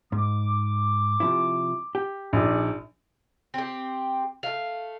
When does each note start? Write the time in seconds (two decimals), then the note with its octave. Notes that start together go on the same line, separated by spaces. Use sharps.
0.12 G#2 D6
1.20 C3 F3 E4
1.95 G4
2.33 A#1 D#4 G#4 D5
3.54 C4 G4
4.43 A3 F5